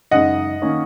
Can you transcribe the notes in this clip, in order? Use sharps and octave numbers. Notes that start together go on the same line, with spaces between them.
F#2 C#3 G#3 D#4 D#5 F#5
D#3 A#3 C#4